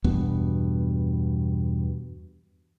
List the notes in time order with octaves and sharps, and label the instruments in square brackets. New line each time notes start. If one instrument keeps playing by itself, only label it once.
[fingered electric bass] E2 G2 B2 B3